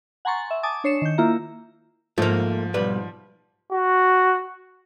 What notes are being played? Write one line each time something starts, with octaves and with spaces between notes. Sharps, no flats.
F#5 G#5 A#5 C6 C#6 A6
E5
G#5 A5 D6 D#6 A6
D4 C#5 C7 C#7 E7
D#3 G6
A#3 E4 F4 E5 A#5
G#2 F3 A3 A#3
B1 G3 B4
F#4